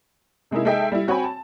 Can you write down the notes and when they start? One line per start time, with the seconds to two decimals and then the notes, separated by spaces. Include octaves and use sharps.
0.51 C3 G#3 A#3 D#4 E4
0.65 G#3 D#4 A4 E5 G5
0.92 G3 E4
1.07 C4 F#4 C#5 G5 G#5 B5
1.24 A5